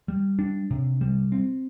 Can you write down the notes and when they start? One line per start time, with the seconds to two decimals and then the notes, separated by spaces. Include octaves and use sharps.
0.08 G3
0.39 D4
0.71 C3
1.01 G3
1.32 C4